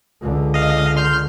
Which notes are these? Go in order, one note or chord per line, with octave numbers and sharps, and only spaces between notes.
C#2 D3
D#5 F5
C6 F6 G6